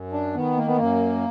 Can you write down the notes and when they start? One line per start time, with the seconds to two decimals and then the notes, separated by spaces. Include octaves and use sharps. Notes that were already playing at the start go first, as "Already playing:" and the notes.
Already playing: F#2
0.12 D4
0.35 D#3 B3
0.57 A#3
0.67 B3
0.77 F#2 A#3